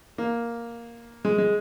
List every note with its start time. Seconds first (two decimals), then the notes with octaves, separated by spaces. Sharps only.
0.18 A#3
1.25 G#3
1.38 G#3